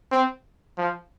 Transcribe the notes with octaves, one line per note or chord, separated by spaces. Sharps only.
C4
F3